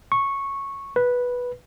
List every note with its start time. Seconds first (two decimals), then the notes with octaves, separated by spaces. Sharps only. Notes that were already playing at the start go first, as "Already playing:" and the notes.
0.12 C#6
0.96 B4